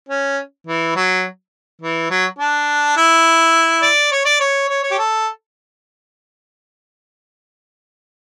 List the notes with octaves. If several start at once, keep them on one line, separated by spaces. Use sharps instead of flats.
C#4
E3
F#3
E3
F#3
D4
E4
D5
C#5
D5
C#5
C#5
C#5
G4
A4